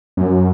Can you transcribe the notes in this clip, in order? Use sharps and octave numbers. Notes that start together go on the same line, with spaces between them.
F#2